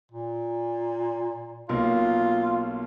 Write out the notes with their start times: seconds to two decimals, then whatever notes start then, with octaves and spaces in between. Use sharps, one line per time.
0.12 A#2
1.69 B1 A#3 F4